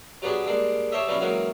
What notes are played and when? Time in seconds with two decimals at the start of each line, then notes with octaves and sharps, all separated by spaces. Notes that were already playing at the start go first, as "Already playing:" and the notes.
0.22 F#3 G3 B3 D4 G4 G#4
0.47 G3 G#3 A#3 D4
0.92 G4 A4 C5 C#5 D#5 E5
1.07 B2 F#3 G3 B3 C#4 E4
1.20 E3 F#3 G#3 A#3 C#4 F#4